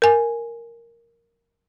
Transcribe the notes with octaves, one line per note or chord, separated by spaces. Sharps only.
A#4 G#5